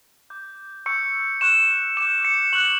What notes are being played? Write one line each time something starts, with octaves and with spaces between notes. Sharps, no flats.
D6 G6
C#6 E6 G6 C#7
C#6 F#6 E7
D6 G6 E7
C#7
C#6 F#6 F#7